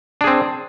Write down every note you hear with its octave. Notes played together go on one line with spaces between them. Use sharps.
C4 D4 G#4